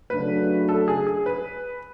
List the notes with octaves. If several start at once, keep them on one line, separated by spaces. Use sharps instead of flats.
C#3 F#3 A3 D4 B4
A4
G#4
G#4
B4